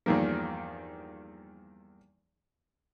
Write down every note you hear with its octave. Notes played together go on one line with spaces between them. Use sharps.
E2 G2 D#3 F3 A#3